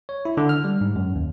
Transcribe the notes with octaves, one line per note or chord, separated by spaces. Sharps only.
C#5
E4
D3
F6
G3
G#2
F#2
D#2